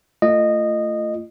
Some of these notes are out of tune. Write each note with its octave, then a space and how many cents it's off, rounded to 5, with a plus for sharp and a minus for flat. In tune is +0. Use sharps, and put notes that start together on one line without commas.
A3 +20 F4 -30 D#5 -15